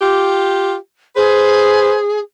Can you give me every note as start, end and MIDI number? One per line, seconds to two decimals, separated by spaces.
0.01 0.74 65
0.01 0.74 67
1.16 2.19 68
1.16 1.97 71
1.16 1.97 72